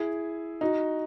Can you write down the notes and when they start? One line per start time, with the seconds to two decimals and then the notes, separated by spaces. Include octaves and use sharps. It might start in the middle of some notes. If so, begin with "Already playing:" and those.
Already playing: E4 G#4
0.61 D#4 F#4